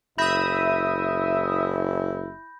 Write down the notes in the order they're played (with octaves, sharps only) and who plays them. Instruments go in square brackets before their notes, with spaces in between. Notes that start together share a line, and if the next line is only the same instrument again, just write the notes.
[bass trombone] F#1 [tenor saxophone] E4 [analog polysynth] E5 D#6 [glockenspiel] B5 G6 A#6